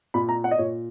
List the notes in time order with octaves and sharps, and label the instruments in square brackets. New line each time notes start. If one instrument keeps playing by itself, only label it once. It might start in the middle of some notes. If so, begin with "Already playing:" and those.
[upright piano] A#2 B5
A#5
F#5
D#5
A#2 C#5